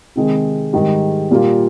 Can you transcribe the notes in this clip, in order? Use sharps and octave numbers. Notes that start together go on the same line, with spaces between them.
C3 D#3 G#3
G#2 D#3 G3
A#2 G3 A#3 F4